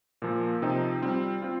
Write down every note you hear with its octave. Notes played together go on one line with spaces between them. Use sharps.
A#2 F3 A#3
C3 F3 C4 D#4
G3 C4 F4
C4 F4